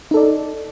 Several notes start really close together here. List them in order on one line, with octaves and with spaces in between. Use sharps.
D#4 A4 D5